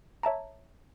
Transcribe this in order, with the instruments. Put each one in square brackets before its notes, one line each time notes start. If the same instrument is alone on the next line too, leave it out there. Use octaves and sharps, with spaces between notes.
[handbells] C#5 E5 A5 A#5